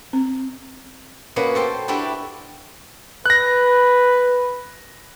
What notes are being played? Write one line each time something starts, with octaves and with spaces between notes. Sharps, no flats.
C4
B2 A#3 B3 C#4 B4
A4 C5 G5
D4 E4 F#4 G4 A4 B4
B4 F#6 A#6